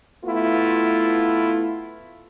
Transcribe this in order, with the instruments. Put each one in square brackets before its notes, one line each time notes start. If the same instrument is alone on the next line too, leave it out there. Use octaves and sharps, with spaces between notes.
[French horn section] A3 B3 E4 F4